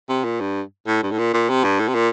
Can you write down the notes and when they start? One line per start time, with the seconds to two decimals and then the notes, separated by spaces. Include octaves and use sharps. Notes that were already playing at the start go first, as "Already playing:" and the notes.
0.09 C3
0.24 A#2
0.40 G2
0.86 A2
1.03 G2
1.11 A2
1.18 A#2
1.33 A#2
1.49 C3
1.64 G2
1.79 A2
1.88 C3
1.95 A#2